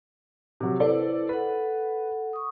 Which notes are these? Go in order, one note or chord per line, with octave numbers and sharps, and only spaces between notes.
C3 F#3
E4 A4 B4 C5 D5
A4 B4 F#5
C#6 D#6